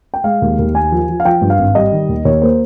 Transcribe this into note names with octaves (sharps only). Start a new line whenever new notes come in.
G5
G#3 F5
D#2
D#2
A#3 G#5
F3
F3
F5
F3 G5
G2
F5
G#1
G3 D#5
D#3
D#2
D#2 C#5
A#3 C5